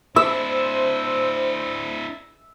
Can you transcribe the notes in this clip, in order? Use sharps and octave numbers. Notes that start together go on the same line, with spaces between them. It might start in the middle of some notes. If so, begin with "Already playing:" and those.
D4 E4 C5 E5